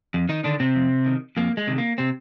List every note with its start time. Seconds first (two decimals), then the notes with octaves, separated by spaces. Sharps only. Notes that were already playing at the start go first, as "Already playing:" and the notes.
0.14 F2
0.29 D#3 D#4
0.44 D3 D#3 D4
0.60 C3 C4
0.76 F2
1.06 D#3
1.37 F2 A#3
1.57 G#3
1.67 C3 D#3
1.78 A#3
1.98 C3 C4